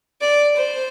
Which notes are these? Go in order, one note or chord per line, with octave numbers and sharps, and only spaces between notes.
D5
C5